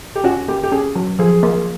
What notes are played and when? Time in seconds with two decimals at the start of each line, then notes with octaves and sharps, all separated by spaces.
0.16 G4
0.24 C#4 F#4
0.48 A#3 G4
0.64 G4
0.72 C#4 G#4
0.96 F#3
1.19 F3 G#4
1.43 A#3